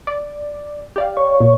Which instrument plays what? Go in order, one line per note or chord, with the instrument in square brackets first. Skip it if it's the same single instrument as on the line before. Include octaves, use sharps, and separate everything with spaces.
[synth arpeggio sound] D5
G4 D5 F5
[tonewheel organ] C#5
[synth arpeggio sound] A#2